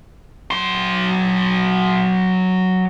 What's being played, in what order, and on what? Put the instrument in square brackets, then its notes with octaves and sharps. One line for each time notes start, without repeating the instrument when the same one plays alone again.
[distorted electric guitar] F#3 C6